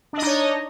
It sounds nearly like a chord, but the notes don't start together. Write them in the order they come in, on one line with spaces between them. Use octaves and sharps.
D4 D#5 D#4 C#5